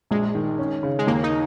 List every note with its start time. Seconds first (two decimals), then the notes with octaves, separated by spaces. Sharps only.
0.11 A#1 G#3
0.35 D#3
0.59 C#4
0.83 C#3
0.99 G#3
1.07 D#2 A#3
1.24 D#4